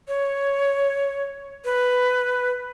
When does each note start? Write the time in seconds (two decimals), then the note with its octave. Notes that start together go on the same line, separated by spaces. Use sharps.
0.08 C#5
1.65 B4